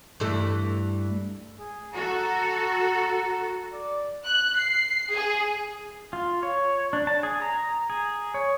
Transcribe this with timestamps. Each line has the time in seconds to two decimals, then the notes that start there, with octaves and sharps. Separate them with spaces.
0.20 G2 E3 A3
1.59 G#4
1.94 F#4 A4 A#5
3.73 D5
4.25 F#6
4.58 C7
5.14 G#4
6.13 F4
6.43 C#5
6.93 D4
7.07 A5
7.23 G#4
7.42 A#5
7.90 G#4
8.34 C#5